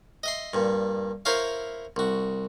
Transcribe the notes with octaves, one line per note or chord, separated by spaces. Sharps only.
D#5 E5 C6
G2 A#2
E4 A#4 C5 C#5 E5 F5
C2 F#4